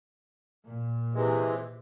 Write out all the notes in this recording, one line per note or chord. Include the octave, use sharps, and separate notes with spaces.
A#2
C3 E3 G#3